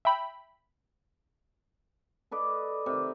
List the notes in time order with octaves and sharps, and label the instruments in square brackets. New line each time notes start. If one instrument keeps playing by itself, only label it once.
[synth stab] E5 G5 B5
[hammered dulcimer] A4 B4 D5 D#5
C3 D#3